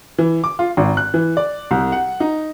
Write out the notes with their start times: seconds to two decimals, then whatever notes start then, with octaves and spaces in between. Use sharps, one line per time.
0.18 E3
0.44 D6
0.59 F4
0.77 G#1
0.97 F#6
1.14 E3
1.37 D5
1.71 C2
1.92 F#5
2.20 D#4